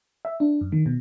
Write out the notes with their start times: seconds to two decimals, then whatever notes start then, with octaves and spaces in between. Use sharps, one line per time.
0.25 E5
0.40 D4
0.61 F#2
0.72 D#3
0.86 B2